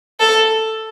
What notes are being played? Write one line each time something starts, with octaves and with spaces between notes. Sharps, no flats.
A4